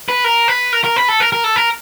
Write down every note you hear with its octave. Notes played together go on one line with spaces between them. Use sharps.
B4
A#4
B4
A#4
A#4
B4
A4
A#4
A#4
A4
A#4